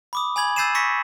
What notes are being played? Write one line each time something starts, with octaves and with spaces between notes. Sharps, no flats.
B5 D6 D#6
G#5 B5 G#6 F#7
E6 G6 A6 C7 D#7 E7
C#6 E6 A#6 B6 C#7